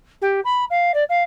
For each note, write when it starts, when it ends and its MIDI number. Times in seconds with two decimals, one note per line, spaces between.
0.22 0.41 67
0.45 0.65 83
0.70 0.92 77
0.94 1.04 74
1.09 1.23 77